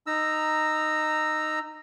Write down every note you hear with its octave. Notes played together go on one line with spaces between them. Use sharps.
D#4 A#5 E6